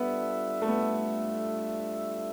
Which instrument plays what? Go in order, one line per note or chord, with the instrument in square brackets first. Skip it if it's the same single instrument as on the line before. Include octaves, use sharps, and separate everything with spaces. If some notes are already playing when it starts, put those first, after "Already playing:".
Already playing: [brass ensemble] G3 D4 F4 A4 E5 [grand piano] B3
[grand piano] A3
B3